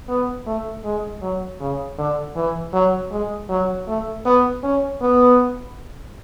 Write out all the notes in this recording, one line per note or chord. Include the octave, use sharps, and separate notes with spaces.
B3
A3
G#3
F#3
C#3
D3
E3
F#3
G#3
F#3
A3
B3
C#4
B3